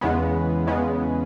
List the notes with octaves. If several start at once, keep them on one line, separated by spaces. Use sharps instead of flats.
E2 C#3 G#3 B3
E2 C#3 G#3 B3